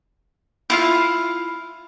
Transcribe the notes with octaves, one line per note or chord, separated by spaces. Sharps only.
E4 F4 F5